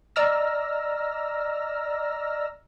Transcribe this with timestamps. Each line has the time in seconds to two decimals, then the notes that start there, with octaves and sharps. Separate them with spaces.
0.16 D5 D#5 A#5 E6 F6 A#6